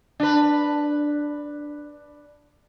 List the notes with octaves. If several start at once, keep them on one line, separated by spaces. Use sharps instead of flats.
D4 B4